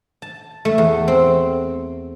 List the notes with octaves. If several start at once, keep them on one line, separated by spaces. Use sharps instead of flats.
A5
A3
E2
C4